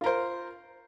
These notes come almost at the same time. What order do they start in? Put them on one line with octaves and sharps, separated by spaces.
F4 A#4 C5